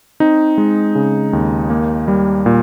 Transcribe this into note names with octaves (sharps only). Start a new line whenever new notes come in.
C4 D#4
G#3
C#3
D#2
A#3
G3
A#2